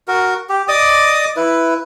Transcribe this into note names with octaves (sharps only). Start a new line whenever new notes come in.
F#4 A#4
G4
D5 D#5 D6 D#6
E4 B4